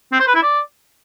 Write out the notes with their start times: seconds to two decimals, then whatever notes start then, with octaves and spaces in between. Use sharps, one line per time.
0.12 C4
0.20 C5
0.27 B4
0.35 E4
0.43 D5